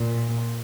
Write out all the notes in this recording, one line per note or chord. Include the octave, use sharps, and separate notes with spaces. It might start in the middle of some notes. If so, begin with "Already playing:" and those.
Already playing: A#2